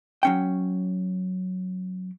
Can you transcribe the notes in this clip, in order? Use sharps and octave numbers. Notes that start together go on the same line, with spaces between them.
F#3 C#4 G5